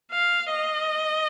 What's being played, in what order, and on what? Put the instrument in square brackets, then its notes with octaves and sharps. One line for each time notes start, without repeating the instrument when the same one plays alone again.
[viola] F5
D#5